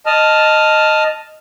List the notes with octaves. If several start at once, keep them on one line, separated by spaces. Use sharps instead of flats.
D#5 A5 F6